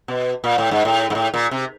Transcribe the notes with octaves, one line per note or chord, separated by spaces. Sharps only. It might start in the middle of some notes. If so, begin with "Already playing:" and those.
B2
A#2
A2
G#2
A2
G#2
A2
A#2
C3